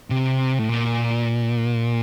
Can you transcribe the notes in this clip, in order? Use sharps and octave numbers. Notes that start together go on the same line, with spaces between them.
C3
A2
A#2